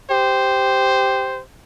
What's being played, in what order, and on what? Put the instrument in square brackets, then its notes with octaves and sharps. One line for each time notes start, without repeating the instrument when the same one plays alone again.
[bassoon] G4 [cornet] C5